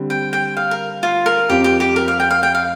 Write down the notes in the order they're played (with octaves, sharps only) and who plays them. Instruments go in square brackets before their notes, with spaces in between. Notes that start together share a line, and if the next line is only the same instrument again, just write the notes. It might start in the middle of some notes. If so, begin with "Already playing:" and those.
Already playing: [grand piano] D3 G3 C4
[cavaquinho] G5
G5
F5
A#4
F4
A#4
[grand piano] F2 F3 C4 F4 [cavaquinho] G4
[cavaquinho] G4
G4
A#4
F5
G5
F5
G5
F5